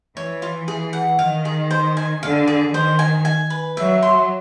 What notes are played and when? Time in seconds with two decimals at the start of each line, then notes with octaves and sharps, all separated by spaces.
0.17 E3 C#5
0.42 F4
0.68 G#4
0.93 F#5
1.19 D#3 F5
1.45 G#4
1.71 C5
1.97 G#5
2.22 D3 F5
2.47 G#4
2.74 D#3 C5
2.99 G#5
3.25 G#5
3.50 B4
3.77 F#3 E5
4.02 C6